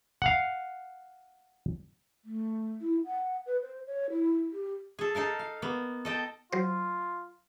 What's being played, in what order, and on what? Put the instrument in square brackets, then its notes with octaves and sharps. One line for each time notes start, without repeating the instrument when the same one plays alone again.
[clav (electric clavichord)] F5 F#5
[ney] A3
E4
F#5
B4
C5
C#5
E4
G4
[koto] G#4 A4
D#4 A4 A#4 F5
F5
A#3 B3
A4 D#5 G5 A5
[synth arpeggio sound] F#3 C5 [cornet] F4